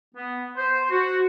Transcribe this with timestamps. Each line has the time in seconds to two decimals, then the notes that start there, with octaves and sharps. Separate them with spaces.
0.15 B3
0.56 C5
0.90 F#4